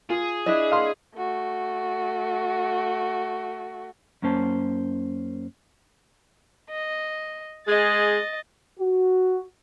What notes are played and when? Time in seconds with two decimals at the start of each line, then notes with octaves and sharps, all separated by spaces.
0.10 F4 G#4
0.46 D4 E4 D#5
0.72 F5 C6
1.15 A3 F#4
4.22 F#2 A#3 C#4 C5 A5
6.70 D#5
7.67 G#3 G#4 D#5 A6
8.79 F#4